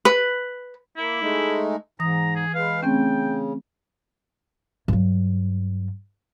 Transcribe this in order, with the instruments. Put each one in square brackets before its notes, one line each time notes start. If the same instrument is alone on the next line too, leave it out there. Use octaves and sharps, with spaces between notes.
[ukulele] B4
[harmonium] A#3 [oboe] E4
[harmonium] G#3 A3 D#4
[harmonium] G#2 [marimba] E3 D#6 [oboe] A#5
[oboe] G#4
[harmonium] G#3 B4 [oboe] F5
[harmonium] C#3 [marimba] A3 C4 C#4 [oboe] G5
[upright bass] G2 F#3